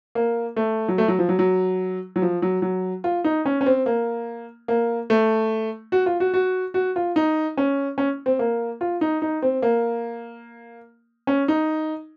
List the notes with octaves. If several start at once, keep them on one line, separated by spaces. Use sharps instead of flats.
A#3
A3
F#3
A3
F#3
F3
F#3
F#3
F#3
F3
F#3
F#3
F4
D#4
C#4
C#4
C4
A#3
A#3
A3
F#4
F4
F#4
F#4
F#4
F4
D#4
C#4
C#4
C4
A#3
F4
D#4
D#4
C4
A#3
C#4
D#4